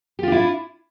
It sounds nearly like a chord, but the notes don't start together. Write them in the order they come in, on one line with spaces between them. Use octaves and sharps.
G4 F4 D4 E4